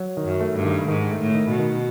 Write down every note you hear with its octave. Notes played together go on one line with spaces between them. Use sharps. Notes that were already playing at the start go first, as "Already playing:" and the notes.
Already playing: F#3
D#3
F#2
A3
G2
D#3
G#2 D#3
A3
A2
D#3
B2
D#3